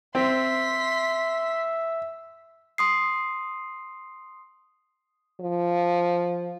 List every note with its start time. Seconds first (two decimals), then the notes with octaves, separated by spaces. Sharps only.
0.15 C4 E5 C6 B6
2.78 C6 D#6 C7
5.40 F3